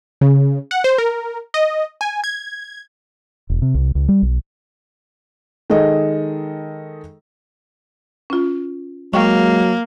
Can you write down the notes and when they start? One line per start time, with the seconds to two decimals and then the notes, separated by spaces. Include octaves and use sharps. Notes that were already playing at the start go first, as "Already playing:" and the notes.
0.21 C#3
0.71 F#5
0.84 C5
0.98 A#4
1.54 D#5
2.01 G#5
2.24 G#6
3.50 E1
3.62 C3
3.75 C2
3.95 C#2
4.08 G3
4.22 B1
5.70 D#3 G#3 A4 D#5
8.30 C#4 F4
9.14 F#3 G#3 A#3 F5 G5 C#6